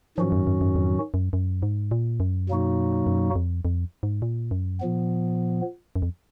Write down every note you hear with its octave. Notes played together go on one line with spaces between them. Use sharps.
G#2 D#3 F3 F#3 C#4 F#4
F#2
F#2
F#2
F2
F#2
F#2
G#2
A#2
F#2
B2 F#3 A#3 D#4 F#4
F#2
F2
F2
G#2
A#2
F#2
A#2 F3 B3
F#2
F2